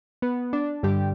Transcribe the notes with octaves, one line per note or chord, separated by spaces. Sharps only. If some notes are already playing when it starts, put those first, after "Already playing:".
B3
D4
G2 D3 G3 G4